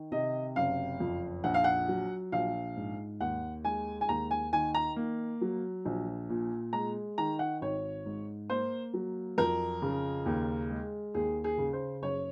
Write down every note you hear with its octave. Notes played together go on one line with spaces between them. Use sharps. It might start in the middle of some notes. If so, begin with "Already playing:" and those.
Already playing: D#3
C3 D#5
F#1 F5
F2
A#1 F#5
F5
F#5
F#3
A#1 F5
G#2
D#2 F#5
G#3 G#5
G#5
D#2 A#5
G#5
D#3 G#5
A#5
A#3
F#3
A#1
A#2
G#3 A#5
D#3 A#5
F#5
G#1 C#5
G#2
A#3 C5
F#3
F2 A#4
C#3
D#2
G#3
D#2 G#4
G#4
C#3
C5
F#1 C#5